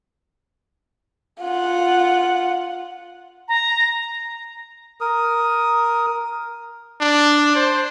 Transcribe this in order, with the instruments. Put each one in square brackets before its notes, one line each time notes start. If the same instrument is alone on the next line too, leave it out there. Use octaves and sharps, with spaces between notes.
[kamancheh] F4 F#5
[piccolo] A#5
[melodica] A#4 D#6
[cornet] D4
C5